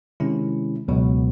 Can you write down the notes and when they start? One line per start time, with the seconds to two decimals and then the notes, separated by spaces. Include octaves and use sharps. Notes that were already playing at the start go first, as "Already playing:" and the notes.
0.20 C3 D#3 G#3 C#4 E4
0.88 C#2 B2 F#3